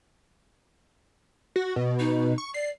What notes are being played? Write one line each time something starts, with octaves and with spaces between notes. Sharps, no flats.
F#4
B2
D#4
C#6
D5 C7